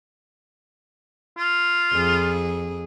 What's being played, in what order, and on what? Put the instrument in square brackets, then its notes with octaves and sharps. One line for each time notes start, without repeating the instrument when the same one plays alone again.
[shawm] F4
[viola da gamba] F2 G#4